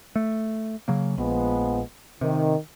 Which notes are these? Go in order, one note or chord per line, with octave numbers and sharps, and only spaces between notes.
A3
C#3 F#3 A#3
A#1 F3 G#3 B3
C3 D#3